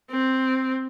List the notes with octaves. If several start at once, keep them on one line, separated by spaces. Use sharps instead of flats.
C4